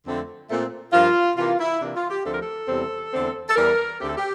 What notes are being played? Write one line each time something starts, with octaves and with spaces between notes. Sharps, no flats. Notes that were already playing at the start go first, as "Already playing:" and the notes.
F2 D3 A3 C4
A#2 A3 C4
G2 F3 A#3 F4
C3 E3 A#3 F4
E4
C3 E3 A#3 D4
F4
G4
D2 D3 F3 A3 C4 A4
A#4
A4
E2 C3 G3 C4
E2 D3 A3 C4
A4
E2 E3 G3 A#4
D2 D3 A3 C4 G4
A4
G4